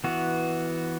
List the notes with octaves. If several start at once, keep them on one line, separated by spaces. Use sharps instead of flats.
E3 B3 F#4